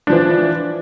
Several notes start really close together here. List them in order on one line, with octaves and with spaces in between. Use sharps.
D4 F3 E3